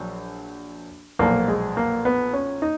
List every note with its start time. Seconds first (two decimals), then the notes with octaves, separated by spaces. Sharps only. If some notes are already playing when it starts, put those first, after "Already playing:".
Already playing: A#1 F#3
1.19 B1 A#2 F3 A#3
1.48 G#3
1.77 A#3
2.05 B3
2.33 C#4
2.62 D#4